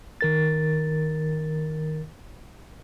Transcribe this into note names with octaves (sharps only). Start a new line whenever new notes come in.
D#3 A#4 A6